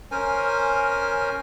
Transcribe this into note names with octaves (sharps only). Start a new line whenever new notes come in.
C#4 A#4 C5 G#5